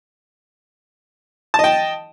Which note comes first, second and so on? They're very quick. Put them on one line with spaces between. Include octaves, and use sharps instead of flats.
A5 D#5 G5